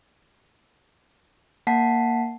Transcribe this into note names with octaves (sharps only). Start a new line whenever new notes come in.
A#3 F#5 A5 B6 C7